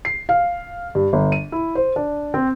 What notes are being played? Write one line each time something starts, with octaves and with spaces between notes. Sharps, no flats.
C7
F5
G2
G1
D#7
E4
C5
D4
C4